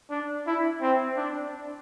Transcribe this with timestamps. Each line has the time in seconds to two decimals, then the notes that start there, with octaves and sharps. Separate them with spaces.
0.11 D4
0.47 E4
0.82 C4
1.17 D4